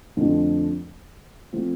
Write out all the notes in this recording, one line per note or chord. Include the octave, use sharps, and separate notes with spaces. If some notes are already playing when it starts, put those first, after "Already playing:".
F2 D3 F3 A3
F3 A3 C4 F4